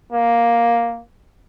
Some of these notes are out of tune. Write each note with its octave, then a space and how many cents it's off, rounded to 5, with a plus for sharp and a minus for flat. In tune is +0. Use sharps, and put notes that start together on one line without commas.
A#3 +5